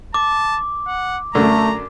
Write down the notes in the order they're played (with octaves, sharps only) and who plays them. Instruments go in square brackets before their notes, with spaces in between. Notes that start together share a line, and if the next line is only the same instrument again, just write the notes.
[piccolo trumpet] A5 [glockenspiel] D6
[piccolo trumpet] F#5
[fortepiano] F#2 D3 [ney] A3 [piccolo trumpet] A#5